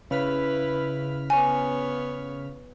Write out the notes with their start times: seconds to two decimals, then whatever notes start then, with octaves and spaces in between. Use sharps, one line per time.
0.11 C#3 E4 B4 F6 B6
1.30 B3 C#5 G#5